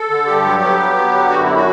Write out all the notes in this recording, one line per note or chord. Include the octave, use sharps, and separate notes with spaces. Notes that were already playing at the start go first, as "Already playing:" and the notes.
Already playing: A4
D3
G2 G4
F#3
B3
F#3
B3
D3
F#2 F#4
F#3 E4
F#4